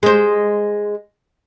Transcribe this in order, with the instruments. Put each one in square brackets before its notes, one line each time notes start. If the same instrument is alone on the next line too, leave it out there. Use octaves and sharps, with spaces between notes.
[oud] G#3 C5